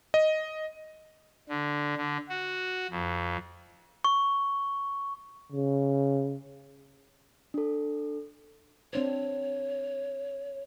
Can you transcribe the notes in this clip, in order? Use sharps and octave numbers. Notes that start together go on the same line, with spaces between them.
D#5
D3
D3
F#4
F2
C#6
C#3
D4 A4
C4 D4 C5 C#5